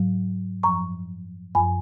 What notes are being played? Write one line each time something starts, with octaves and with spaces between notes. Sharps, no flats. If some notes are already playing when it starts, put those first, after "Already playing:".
Already playing: G#2 F#3
F#2 F3 A#5 C#6
F#2 F3 G#5 B5